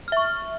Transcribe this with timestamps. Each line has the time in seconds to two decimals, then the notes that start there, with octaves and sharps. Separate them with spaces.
0.08 F6
0.12 E5
0.17 C#6